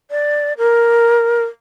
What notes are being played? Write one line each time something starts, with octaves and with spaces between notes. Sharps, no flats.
D5
A#4